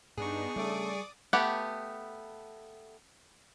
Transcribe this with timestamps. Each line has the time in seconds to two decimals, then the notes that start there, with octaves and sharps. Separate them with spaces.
0.17 G2 B3 D4 D#4 G#4 C#6
0.56 C#3 G3 A3 D5 D6 D#6
1.33 A3 B3 G4 F#5